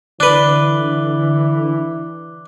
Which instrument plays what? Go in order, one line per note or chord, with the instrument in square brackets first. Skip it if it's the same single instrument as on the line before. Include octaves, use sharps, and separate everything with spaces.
[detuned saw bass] D3 [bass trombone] E3 [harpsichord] D4 B4 [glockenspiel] D6 F#6 G7